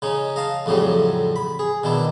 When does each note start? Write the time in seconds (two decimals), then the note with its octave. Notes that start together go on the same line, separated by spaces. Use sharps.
0.02 C#3 C#4 D#4
0.36 D#5 F5 A5
0.66 F2 A2 C#3 F#3 G3
1.36 B5
1.59 G#4
1.83 B2 D#3 D4 E4